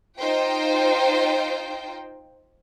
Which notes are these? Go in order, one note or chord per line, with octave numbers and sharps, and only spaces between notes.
D#4 F4 C5 G5